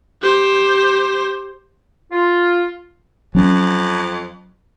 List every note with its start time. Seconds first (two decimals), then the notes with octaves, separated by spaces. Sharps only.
0.22 G4 C5
2.12 F4
3.35 F2 F#3 C#4